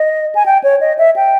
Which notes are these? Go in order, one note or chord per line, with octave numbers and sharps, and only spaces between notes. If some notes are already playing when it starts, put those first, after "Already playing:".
Already playing: D#5
G#5
G5
C#5
D#5
E5
G5